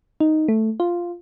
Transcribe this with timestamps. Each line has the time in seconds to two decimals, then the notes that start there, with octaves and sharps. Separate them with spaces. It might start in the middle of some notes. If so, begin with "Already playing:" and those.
0.20 D#4
0.48 A3
0.80 F4